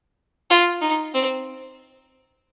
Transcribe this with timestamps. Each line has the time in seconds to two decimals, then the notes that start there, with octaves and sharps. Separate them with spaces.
0.50 F4
0.81 D#4
1.14 C4